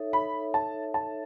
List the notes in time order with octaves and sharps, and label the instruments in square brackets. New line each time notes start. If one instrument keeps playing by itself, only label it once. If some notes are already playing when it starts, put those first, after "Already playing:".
Already playing: [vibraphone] D#4 A4 C#5 E5
[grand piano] B5
A5
A5